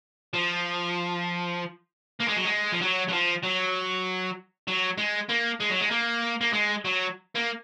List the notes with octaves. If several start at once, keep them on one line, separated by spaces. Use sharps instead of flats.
F3
A#3
G#3
F#3
G#3
F3
F#3
F#3
F3
F#3
F#3
G#3
A#3
G#3
F#3
G#3
A#3
A#3
G#3
F#3
A#3